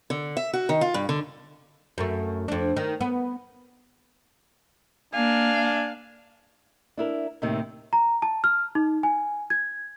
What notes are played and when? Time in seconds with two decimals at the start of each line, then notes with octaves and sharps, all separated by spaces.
0.10 D3
0.37 E5
0.53 F#4
0.69 D#3
0.81 F4
0.94 G2
1.09 D3
1.98 F#2 A3
2.48 F2 D4
2.76 D#3
3.01 B3
5.14 A#3 D4 F5 G#5
6.97 D4 E4 A#4
7.42 D#2 A2 C3 D#3
7.93 A#5
8.22 A5
8.44 F6
8.75 D#4
9.03 G#5
9.50 G#6